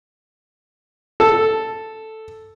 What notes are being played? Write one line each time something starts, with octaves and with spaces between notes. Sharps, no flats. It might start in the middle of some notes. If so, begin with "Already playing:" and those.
A4